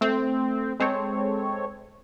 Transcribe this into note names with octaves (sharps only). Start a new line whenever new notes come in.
A3 C4
G#3 C4 A4 C#5